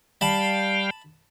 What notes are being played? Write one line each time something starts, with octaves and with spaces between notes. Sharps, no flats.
G3 F5 G5 A5 B5